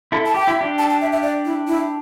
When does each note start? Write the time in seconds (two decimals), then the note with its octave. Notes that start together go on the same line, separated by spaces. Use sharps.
0.12 E4 A4
0.26 A5
0.34 G4 G5
0.47 E4
0.61 D4 G4
0.78 A5
0.90 A5
1.01 E5
1.12 E5
1.22 D5
1.45 E4
1.67 E4